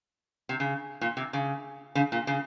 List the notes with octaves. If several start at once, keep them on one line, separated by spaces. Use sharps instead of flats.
C3
C#3
A#2
C3
C#3
C#3
A#2
C#3